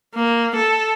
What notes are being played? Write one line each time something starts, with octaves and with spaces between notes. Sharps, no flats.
A#3
A4